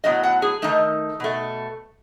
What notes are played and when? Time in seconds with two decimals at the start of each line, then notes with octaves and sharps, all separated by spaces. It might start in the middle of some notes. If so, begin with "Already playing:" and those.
0.04 A2 F#3 B3 D#5
0.23 F#5
0.42 G#4
0.62 D#3 A3 D#4
1.20 B2 A3